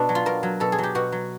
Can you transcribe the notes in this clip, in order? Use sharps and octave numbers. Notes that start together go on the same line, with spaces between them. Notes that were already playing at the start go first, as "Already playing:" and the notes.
Already playing: B2 D4
F#3
F4
B2 A#4
F#3
B2 A4
G#4
F#3 G4
B2 F#4
F#3